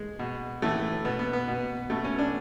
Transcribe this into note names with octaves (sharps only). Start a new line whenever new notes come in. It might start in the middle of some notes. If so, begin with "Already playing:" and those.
Already playing: G#3
B2
A2 E3 A3
B2 B3
B3
B3
B2
B2 A3
C#4
D4